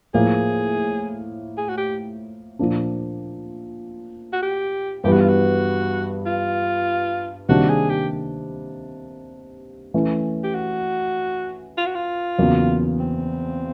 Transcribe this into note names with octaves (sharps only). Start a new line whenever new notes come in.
A2 F3 A#3 G#4
G#4
F#4
G4
A#2 F3 A#3 D4
F#4
G4
G2 E3 G3 B3 G4
F#4
F4
F#4
F4
C3 D#3 G3 A#3 D4 F#4
G#4
G4
E3 A3 C#4
G4
F#4
F4
F#4
F4
E2 C#3 F#3 A#3
C4